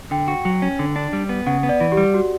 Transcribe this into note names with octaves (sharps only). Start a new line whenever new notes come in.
D3 G5
F#4
F#3
C#4
D3
D4
G3
B3
C#3 F#5
B3
D5
E3
G4
G3
F#4